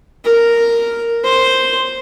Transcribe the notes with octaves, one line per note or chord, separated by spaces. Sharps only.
A#4
C5